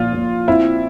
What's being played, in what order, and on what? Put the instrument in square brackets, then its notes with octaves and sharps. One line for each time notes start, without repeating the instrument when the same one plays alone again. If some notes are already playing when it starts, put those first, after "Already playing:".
Already playing: [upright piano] A#2 F3 [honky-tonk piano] F4
[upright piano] A#2
[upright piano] C4 [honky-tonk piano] E4